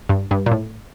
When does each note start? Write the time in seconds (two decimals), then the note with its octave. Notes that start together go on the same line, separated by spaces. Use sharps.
0.09 G2
0.31 G2
0.46 A#2
0.51 A2